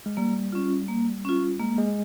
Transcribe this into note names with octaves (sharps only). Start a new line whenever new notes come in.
G#3
G3 A#3
C#4 F4
A#3
C#4 F4
G#3 A#3
G#3